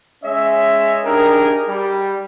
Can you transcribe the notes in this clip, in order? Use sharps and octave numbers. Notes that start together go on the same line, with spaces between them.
G#3 C#4 C#5 D#5 E5
D4 D#4 G4 G#4 A#4
G3